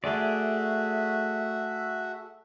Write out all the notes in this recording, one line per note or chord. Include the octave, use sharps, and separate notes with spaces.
A3 F#4 G#4 D5 E5